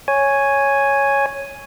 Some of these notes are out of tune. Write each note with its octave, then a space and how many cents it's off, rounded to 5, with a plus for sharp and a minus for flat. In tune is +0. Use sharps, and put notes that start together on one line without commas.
C#5 +0 G#5 +0